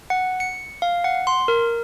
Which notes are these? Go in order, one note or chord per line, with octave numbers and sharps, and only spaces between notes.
F#5
C#7
F5
F#5
C6
A#4